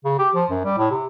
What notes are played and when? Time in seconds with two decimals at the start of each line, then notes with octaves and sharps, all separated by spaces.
0.05 C#3
0.19 G4
0.35 F3
0.51 F#2
0.64 G3
0.78 A2
0.91 C3